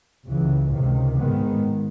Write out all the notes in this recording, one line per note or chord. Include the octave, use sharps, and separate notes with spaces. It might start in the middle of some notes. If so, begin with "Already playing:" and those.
C#2 C#3 E3
C#2 C3 D#3
G#2 D#3 G#3 B3